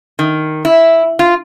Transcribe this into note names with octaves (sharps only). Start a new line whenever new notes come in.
D#3
E4
F4